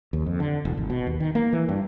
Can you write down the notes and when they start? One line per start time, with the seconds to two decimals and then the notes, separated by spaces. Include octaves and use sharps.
0.13 D#2
0.26 F2
0.40 D3
0.65 E1
0.77 G#1
0.90 B2
1.07 D#2
1.20 D#3
1.35 A#3
1.53 E3
1.69 G2